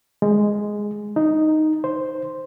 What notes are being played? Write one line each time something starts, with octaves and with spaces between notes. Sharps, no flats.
G#3
D#4
C5